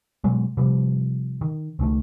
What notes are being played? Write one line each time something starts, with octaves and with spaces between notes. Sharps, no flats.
B2 F#3 G#3
C3 F3 G3
D#3
C#2 D#3 A3